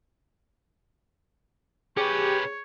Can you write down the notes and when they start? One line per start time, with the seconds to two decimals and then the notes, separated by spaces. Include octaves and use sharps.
1.97 C#4 G4 G#4 B4 C#5